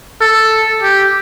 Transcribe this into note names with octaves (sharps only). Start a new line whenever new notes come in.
A4
G4